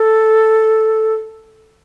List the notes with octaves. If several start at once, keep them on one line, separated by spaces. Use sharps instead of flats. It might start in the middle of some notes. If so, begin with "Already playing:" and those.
Already playing: A4